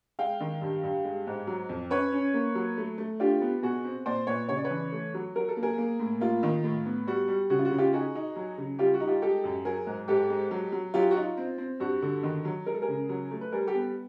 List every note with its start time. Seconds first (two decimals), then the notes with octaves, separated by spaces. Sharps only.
0.19 G#3 F5 G5
0.40 D#3
0.61 G2
0.83 G2
1.05 G#3
1.27 G#2
1.47 F#3
1.69 F2
1.90 C#4 B4 C#5
2.12 C#4
2.34 A#3
2.55 F#3
2.77 A3
2.98 A3
3.20 D4 F4 G4
3.41 B3
3.62 B2 F#4 G#4
3.85 C4
4.06 A#2 C5 D5
4.27 A#2 B4 C#5
4.49 C#3 C#5
4.57 D5
4.64 B4 C#5
4.70 E3
4.92 A3
5.14 F#3
5.35 F#3 A#4
5.49 A4
5.57 A#3
5.63 G#4 A#4
5.78 A#3
5.99 A2
6.20 A#3 F4
6.43 D#3
6.64 A2
6.86 B3
7.07 G3 F#4
7.28 G3
7.50 C#3 F#4
7.59 F4
7.65 F#4
7.71 C#3
7.78 F4 G4
7.93 D#4 F#4 G#4
8.15 D#4
8.36 F#3
8.58 C#3
8.79 G3 F4 G4
8.94 F#4
9.00 D#4
9.07 F4 G4
9.22 G#3 G4 A4
9.44 F#2
9.65 F#3 G#4 A#4
9.87 G#2
10.08 G#2 G4 A4
10.30 G#3
10.51 F#3
10.72 F#3
10.94 F#3 F4 G4
11.11 F#4
11.15 D#4 F4
11.37 C4
11.58 C4
11.80 G2 F#4
12.02 D3
12.23 D#3
12.45 F#3
12.66 G#3 A#4
12.74 A4
12.82 G#4 A#4
12.88 C#3
13.09 F#3
13.31 A3
13.41 B4
13.52 G3 G#4 A#4
13.67 G4 A4
13.74 B3